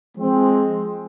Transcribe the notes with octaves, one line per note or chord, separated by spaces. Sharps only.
F3 G#3 C4